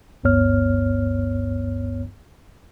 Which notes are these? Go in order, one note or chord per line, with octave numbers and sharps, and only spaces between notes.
G1 D2 G2 B3 C#5 F6